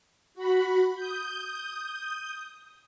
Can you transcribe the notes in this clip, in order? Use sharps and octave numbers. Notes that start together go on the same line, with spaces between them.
F#4 B5
D#6 G6